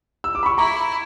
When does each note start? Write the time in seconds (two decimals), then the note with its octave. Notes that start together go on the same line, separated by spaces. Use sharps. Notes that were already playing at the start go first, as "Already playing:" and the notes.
0.24 E6
0.35 D6
0.43 B5
0.46 C#6
0.58 E4 A#5